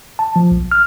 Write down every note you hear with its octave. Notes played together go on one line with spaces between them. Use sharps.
A5
F3
B1
F6